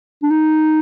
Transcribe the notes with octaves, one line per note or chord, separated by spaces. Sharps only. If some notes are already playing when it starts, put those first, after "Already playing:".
D4
D#4